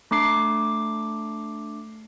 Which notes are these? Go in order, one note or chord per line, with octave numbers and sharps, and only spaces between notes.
A3 D4 D6 C7